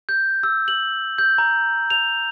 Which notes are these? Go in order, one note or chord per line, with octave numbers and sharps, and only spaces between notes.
G6
E6
F#7
G6
A#5
F7